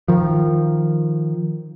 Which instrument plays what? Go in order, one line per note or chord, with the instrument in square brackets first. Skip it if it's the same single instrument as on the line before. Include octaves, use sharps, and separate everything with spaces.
[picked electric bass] D#3 F3